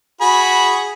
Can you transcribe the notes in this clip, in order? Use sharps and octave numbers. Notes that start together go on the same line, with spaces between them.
F#4 G#4 B5